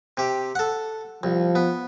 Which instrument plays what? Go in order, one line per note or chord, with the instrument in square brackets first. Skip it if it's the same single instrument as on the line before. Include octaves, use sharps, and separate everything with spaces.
[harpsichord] C3 G4
A4 F#5
[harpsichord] C2 [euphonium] F3
[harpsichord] B3